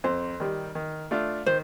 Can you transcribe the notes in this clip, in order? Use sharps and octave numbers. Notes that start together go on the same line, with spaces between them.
F2 C5
D#3 G3
D#3
A3 D4 F4
D#3 C5